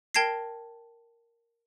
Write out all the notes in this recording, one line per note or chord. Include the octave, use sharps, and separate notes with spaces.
A#4 G5 A5 G#6 A#6 C7